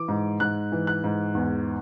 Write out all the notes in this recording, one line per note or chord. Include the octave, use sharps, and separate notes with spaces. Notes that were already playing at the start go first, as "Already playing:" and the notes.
Already playing: E3 D6
G#2
G#2 F#6
E3
F#6
G#2
E2